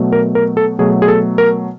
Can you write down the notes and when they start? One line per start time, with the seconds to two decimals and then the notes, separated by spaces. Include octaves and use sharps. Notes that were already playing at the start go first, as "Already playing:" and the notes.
Already playing: B2 F#3 A3
0.12 A#4
0.35 A#4
0.57 A4
0.79 B2 F#3 A3 G#4
1.02 G#4
1.08 A4
1.38 A#4